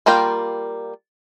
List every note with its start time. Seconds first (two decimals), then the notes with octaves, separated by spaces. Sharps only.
0.06 G3 A#3 F4 A#4 G5